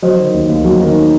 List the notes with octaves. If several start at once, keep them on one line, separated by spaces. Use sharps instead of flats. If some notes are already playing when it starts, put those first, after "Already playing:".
F#3 C5 D#5
D#3
D#2
D#2
F#3
D#3